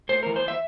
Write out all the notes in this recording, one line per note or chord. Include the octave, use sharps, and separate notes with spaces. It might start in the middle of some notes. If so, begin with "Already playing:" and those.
A3 C5
E3 A#4
C5
E5